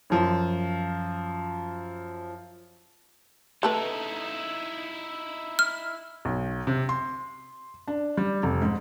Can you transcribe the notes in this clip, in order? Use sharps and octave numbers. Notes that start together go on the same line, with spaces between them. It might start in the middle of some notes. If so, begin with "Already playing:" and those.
F#2 F3
A3 D#4 E4 A4 B4
F6
B1
C3
C6
D4
G3
F1
G#2